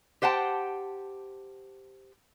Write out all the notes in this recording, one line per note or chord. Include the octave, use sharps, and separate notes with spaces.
G4 C5 F#5 G5 A5